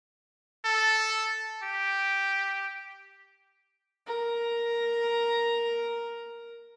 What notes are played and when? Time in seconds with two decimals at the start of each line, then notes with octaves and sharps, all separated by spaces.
0.65 A4
1.64 G4
4.06 A#4 A#5